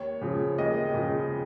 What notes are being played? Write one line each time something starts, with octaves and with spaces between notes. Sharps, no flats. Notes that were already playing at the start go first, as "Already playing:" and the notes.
Already playing: D#2 C#5
C#3 F3
D#2 D#5
C#3 F3